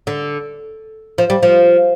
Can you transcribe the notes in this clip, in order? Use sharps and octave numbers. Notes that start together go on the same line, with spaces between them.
D3
F3
G3
F3